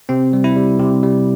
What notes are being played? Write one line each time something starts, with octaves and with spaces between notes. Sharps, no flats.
C3 C4
G3
E4
G3
C3 G4
G3